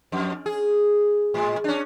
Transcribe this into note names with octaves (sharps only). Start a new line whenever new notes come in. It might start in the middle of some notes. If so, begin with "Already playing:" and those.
F2
G#4
A2 G#3
C#4 D4